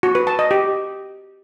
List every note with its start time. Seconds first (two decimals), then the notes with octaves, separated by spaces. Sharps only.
0.03 F#4
0.15 B4
0.27 A5
0.39 D#5
0.51 G4